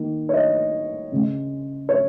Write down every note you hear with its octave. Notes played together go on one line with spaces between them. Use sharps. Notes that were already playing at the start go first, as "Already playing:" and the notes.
Already playing: D#3 A#3
C#5
D#5
C#3 G#3
C#5